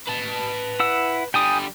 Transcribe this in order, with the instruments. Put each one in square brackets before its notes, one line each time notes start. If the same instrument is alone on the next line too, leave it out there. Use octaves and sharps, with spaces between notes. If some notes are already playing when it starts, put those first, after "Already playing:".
[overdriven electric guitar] B4 A5
[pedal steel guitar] E4 F#5 E6
[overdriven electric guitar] D3 G3 [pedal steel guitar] G5 G#5 D#6